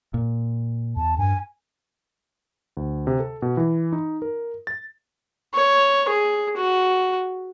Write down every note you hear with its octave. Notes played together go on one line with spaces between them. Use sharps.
A#2
E2 A5
G2 G#5
D2
C3
A4
B2
E3
D#4
A#4
A6
C#5
G#4
F#4